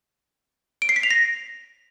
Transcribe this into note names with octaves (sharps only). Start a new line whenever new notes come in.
D7
C7
B6
F7
A#6